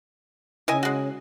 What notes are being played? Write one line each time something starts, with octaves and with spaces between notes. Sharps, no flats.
C#3 E4 D#5 G#5
G#3 F#4